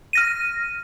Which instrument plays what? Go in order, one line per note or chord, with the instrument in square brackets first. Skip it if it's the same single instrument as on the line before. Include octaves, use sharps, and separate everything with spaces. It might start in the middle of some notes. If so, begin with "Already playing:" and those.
[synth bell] F6 A#6 D#7